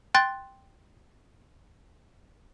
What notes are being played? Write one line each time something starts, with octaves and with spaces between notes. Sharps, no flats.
G5 C6 F#6 A6